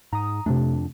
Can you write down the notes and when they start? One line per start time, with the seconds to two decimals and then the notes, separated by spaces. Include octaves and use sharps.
0.13 G#2 A#5 D#6
0.46 F2 C3 A3 D4